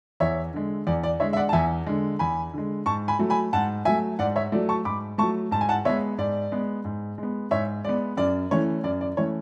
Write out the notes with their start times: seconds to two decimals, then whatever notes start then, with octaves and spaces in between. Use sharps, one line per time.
0.20 E2 C#5 E5
0.54 D3 G#3
0.87 E2 D5
1.03 D5
1.20 D3 G#3 C#5 E5
1.33 E5
1.37 D5 F#5
1.49 A5
1.53 E2 E5 G#5
1.87 D3 G#3
2.19 E2 G#5 B5
2.54 D3 G#3
2.86 G#2 A5 C#6
3.08 G#5 B5
3.19 F#3 A3
3.30 G#5 B5
3.53 G#2 F#5 A5
3.85 F#3 A3 E5 G#5
4.19 G#2 D5 F#5
4.36 C#5 E5
4.52 F#3 A3 D5
4.69 A5 C#6
4.85 G#2 B5 D6
5.18 F#3 A3 A5 C#6
5.51 G#2 A5
5.61 G#5
5.69 F#5 A5
5.85 G#3 B3 C#5 E5
6.18 G#2 D5
6.52 G#3 B3
6.85 G#2
7.18 G#3 B3
7.51 G#2 C#5 E5
7.85 G#3 B3 D5
8.17 F#2 D5
8.51 E3 A3 C#4 C#5
8.84 F#2 D5
9.01 D5
9.17 E3 A3 C#4 C#5